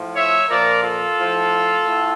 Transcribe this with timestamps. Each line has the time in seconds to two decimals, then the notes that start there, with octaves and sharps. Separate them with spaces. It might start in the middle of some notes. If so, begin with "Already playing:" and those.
Already playing: A2 F3
0.16 C#5 E5
0.49 A#2 F3 A#4 D5
0.83 F4 A4
1.17 A2 F3
1.85 A2